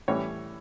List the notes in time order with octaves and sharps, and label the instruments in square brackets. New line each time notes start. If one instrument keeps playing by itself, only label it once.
[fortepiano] A2 E3 G3 C#5